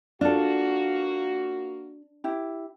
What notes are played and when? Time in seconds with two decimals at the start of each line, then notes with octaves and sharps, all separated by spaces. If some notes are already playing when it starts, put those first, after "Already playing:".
0.21 A#3 D4 F4 F#4 A4
2.24 E4 G4